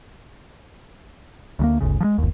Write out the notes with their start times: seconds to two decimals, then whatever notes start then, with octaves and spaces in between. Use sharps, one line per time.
1.59 D2 G3 A#3
1.81 G1 D2 C#3
2.00 F3 G#3
2.18 G1 D#2